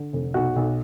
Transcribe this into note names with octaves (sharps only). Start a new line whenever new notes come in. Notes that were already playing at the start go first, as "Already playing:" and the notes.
Already playing: D3
F1
B1 F#4
B1